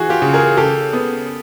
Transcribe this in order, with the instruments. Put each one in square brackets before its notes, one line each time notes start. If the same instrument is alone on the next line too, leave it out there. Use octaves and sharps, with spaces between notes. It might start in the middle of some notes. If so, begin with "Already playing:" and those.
Already playing: [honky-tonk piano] E3 [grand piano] F#4 G#4
[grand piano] F4 G4
[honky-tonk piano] C#3
[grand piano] G#4 A#4
[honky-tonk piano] C#3 [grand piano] G4 A4
[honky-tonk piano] B3